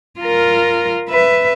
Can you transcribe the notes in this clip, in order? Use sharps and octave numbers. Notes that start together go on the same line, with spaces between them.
F4 A#4
B4 E5